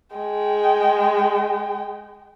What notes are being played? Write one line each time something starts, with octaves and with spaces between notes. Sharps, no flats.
G#3 G5